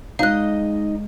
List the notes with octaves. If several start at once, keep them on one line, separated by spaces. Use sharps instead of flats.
G#3 D#4 D#5 F5 F#6